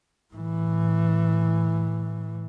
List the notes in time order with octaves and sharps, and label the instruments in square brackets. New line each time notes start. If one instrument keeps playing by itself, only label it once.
[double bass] A2 E3